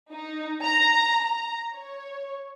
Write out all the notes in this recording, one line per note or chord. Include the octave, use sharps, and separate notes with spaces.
D#4
A#5
A#5
C#5